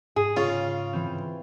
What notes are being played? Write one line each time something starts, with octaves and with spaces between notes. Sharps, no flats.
G#2 G#4
C#3 F4
E3 C4